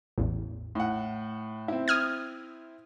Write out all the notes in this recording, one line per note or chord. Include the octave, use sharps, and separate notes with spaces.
A1 E2
A2 F#5
C4 E4
D#6 F6 G#6